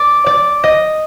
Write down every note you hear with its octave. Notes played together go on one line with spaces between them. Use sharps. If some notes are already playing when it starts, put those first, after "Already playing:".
Already playing: D5
D5
D#5